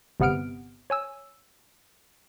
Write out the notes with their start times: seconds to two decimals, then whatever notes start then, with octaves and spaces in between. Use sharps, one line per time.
0.20 G1 C3 B3 F#5 F6 D7
0.90 C#5 G#5 E6